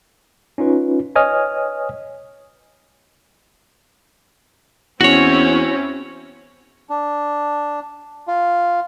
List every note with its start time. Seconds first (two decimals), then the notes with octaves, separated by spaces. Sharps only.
0.58 C#4 D#4 F4 B4
1.15 B4 C#5 D#5 G#5 D#6 F6
5.01 E2 C4 C#4 E4 F#4 C#5
6.89 D4
8.27 F4